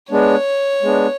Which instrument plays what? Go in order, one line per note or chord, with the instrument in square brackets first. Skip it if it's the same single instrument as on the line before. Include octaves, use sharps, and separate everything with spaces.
[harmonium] G#3 B3 D4 [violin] C#5
[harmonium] G#3 B3 D4